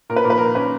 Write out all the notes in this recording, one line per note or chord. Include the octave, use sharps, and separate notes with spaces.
A#2 A#4
B4
A#2 A#4
B4
A#3 A#4
C#4 B4